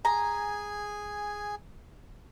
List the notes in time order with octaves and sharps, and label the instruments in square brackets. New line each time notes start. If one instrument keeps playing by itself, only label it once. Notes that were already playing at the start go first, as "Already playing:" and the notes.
[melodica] G#4 G#5 [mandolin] A#5